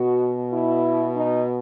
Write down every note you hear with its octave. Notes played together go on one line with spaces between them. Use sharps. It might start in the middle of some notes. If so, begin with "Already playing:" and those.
Already playing: B2 F#4
E4
D#4